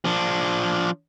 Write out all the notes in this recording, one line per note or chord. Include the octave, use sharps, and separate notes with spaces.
F3 D4